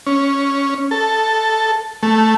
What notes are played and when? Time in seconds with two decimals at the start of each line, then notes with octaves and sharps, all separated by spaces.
0.07 C#4
0.91 A4
2.03 A3